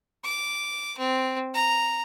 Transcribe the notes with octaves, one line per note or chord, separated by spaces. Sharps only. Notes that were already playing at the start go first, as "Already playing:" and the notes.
D6
C4
A#5